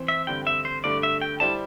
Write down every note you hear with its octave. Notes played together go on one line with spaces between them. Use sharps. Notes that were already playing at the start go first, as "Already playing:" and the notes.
Already playing: E3 C4 C5
E5
G2 D3 C4 G5
E5
C5
G2 D3 A3 D5
E5
G5
G3 E4 G4 C5 A5